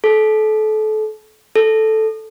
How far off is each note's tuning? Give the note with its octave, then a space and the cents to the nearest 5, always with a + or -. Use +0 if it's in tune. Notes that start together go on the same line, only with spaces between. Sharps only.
A4 -30
A4 -5